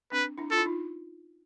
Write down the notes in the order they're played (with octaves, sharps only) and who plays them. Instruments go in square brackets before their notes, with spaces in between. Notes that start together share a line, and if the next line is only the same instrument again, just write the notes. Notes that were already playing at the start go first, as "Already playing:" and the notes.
[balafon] C4 D4 [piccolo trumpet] B4
[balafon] D4 E4
[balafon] F4 [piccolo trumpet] A4
[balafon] E4
D#4 F4